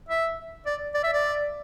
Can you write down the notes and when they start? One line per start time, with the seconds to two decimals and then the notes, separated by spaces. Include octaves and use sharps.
0.09 E5
0.66 D5
0.94 D5
1.03 E5
1.13 D5